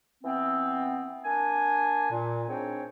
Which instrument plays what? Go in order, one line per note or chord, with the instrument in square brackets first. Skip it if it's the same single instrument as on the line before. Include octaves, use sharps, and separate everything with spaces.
[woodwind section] E3 B3 C4
A#3 D4 G#5
A#2
G#2 C4 D4 C#5 G5